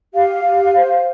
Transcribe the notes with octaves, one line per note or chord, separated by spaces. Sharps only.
G4 F5
G4
C5